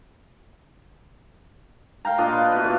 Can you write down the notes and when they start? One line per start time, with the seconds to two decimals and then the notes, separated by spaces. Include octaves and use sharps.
2.05 A#4 F5 G5 A#5
2.18 A#2 D4 F4 D#5
2.33 B4
2.52 B3 E4 F#4
2.64 A#2 F4